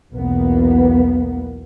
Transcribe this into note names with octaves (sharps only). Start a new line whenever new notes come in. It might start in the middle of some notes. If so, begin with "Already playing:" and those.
B1 E2 A#3 B3